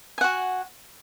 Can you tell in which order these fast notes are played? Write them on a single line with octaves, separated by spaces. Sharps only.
G#5 F#5 F#4